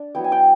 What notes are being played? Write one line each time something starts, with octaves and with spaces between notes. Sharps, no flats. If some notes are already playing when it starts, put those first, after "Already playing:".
Already playing: D4
F#3 B3 E4 G5
G#5
G5